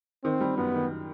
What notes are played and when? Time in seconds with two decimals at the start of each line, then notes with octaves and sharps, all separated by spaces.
0.24 D#3 C4
0.41 G3
0.57 F#2 B3
0.74 D#3